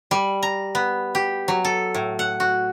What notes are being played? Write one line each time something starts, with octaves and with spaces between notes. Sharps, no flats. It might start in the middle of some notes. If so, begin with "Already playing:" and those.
G3
A#5
B3
G4
F#3
A4
A2
F#5
F#4